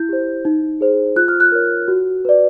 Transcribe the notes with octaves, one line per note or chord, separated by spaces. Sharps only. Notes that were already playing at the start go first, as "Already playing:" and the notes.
Already playing: E4 G6
G4 C5
D#4
G#4 C5
F4 F#6
F6
F#6
A#4 C#5
F#4
B4 D5